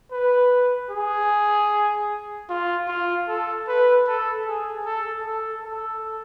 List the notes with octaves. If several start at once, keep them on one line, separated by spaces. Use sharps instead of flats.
B4
G#4
F4
F4
A4
B4
A4
G#4
A4
A4
A4